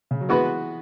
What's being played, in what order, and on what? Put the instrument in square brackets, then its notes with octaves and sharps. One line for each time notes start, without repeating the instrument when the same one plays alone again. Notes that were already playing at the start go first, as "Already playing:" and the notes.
[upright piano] C#3
F#3
[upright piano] E3 [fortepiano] G#3 B3 F#4 B4